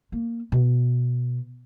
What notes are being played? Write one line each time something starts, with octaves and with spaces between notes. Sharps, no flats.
A#3
B2